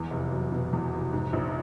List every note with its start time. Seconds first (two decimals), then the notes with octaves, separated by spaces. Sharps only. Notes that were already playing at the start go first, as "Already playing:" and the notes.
Already playing: E2
0.11 F1
0.32 F#3
0.52 B2
0.73 E2
0.93 F1
1.13 G#2
1.33 A#1